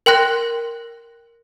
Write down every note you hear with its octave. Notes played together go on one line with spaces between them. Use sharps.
A#4 G5 C6 F#6 A#6